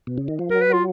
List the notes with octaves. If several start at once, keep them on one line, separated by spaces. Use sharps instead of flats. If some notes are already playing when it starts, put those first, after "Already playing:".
B2
C#3
D#3
F3
F#3 A#4
B4
F4